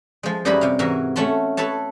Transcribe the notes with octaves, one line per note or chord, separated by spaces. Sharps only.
F3 G#3
F#2 G3 D#4 E4 B4 B5
C3 F5
G#2 E3 F#4 A#4 E5 G#5
A3 C#4 F#5 A5 C6
A4 B4 C#5 A5